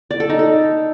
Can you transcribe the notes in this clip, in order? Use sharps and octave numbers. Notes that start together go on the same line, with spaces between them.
D5
A4
D#4
A4